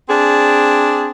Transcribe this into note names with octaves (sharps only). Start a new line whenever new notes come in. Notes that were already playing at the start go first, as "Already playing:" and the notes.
C4 D4 G#4